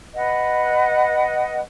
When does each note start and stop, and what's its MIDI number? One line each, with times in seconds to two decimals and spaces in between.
0.15 1.59 71
0.15 1.59 75
0.15 1.59 78